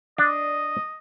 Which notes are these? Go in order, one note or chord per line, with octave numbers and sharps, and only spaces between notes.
D4 D#5